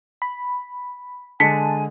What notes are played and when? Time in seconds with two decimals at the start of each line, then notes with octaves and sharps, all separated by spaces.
0.22 B5
1.40 D3 G#3 G#5 A5 B6 C#7